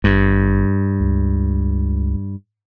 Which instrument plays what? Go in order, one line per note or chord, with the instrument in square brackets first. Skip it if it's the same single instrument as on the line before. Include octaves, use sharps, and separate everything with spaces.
[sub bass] G#1 [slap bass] G2
[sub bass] C#2